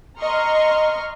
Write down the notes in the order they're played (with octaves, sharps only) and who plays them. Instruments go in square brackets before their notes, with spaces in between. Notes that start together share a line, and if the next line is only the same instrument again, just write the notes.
[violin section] D#5 A#5 C6 C#6 F6